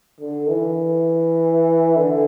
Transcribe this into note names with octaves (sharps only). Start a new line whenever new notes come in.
D3
E3
D3